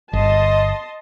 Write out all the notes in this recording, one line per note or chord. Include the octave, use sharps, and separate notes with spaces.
G1 D#5 A5 C6